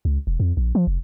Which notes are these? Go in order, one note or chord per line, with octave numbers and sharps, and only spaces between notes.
C#2
E1
F2
A#1
F3
F1